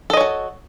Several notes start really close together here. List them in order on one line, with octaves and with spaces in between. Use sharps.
A4 D#5 C#5 F#4